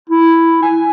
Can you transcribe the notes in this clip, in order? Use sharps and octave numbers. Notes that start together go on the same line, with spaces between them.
E4
G#5